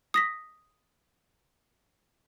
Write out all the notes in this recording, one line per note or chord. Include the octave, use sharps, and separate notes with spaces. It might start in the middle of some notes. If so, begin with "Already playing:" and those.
D#6 A#6 B6